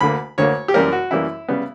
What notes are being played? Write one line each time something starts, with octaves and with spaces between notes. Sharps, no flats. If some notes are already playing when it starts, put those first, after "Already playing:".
D2 D3 A#3 B5
D2 D3 A#3 C#5
G4
F#2 E3 G3 A#3 A#4
F#4
F#2 E3 G3 A#3 E4
C#3 G3 B3